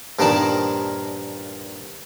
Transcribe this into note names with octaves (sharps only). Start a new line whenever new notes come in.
G2 A#2 D#3 F3 D#4 A5